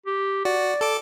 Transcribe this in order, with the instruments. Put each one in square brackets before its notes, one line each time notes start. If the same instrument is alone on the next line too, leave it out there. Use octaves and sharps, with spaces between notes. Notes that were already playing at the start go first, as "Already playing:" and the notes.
[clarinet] G4
[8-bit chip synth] F#4 [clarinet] D5
[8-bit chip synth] A4 D6